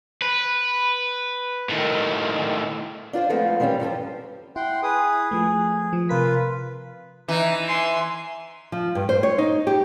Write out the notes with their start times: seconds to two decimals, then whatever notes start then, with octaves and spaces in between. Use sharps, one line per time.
0.22 B4
1.70 A2 D#3
3.13 D4 F4 B4 C5
3.30 F3 G#3 A3 B3 C4 F4
3.60 D#3 E3 G3 C4 C#4
3.80 G2 F3 A4 C5
4.56 E4 F#5 G5 C6
4.83 G#4 B4 D#6
5.31 F3 A3 G#4
5.93 F3
6.09 C3 F4 A#4 B4 B6
7.28 E3 D#4
7.68 G#5 C6
8.72 F3
8.95 G2
9.09 C5
9.23 C#5
9.38 D#4
9.67 G4